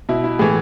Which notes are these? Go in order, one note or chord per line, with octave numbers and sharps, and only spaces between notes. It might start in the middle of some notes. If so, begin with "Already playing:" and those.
B2 E4
E4
A2 E3 G#4